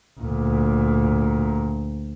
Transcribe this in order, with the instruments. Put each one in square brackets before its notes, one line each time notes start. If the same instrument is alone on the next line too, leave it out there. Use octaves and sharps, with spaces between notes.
[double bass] D2 A#2